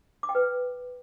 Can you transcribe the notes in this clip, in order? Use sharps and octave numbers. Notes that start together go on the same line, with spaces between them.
D6
G5
B4